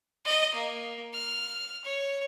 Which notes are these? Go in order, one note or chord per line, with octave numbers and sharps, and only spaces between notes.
D#5
A#3
F6
C#5